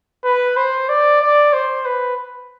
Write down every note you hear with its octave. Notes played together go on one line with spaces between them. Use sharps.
B4
C5
D5
D5
C5
B4